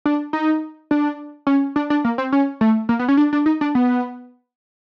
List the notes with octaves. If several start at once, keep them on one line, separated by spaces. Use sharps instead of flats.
D4
D#4
D4
C#4
D4
D4
A#3
C4
C#4
A3
A#3
B3
C#4
D4
D4
D#4
D4
B3